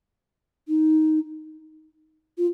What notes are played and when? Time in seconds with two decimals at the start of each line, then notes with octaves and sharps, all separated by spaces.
0.68 D#4
2.38 F4